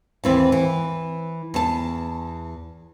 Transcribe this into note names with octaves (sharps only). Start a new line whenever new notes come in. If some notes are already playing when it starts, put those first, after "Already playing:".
D#2 E3 C4
E3
E2 A5